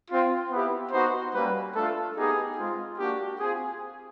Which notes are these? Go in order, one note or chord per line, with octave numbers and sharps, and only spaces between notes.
C4 F4
B3 E4 G4
B3 D#4 F#4 C5
G3 A#3 C#4 B4
A3 D4 F4 A4
B3 D#4 G4 G#4
G#3 C4 F4
A#3 D4 F#4 G4
C4 F4 G#4